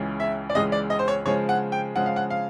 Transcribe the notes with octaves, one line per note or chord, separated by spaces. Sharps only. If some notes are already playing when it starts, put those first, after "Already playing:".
Already playing: C#2 C#3 E3 G#3
E5
D5
C#2 C#3 E3 G#3 D#5
D5
D#5
C5
C#5
C#3 F3 G#3 C#5
F#5
G5
C#3 F3 G#3 F#5
F5
F#5
F5